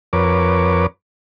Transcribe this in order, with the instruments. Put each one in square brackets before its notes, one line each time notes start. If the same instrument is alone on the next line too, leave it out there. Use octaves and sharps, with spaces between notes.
[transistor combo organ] F2 A#4 B4 C#5 D6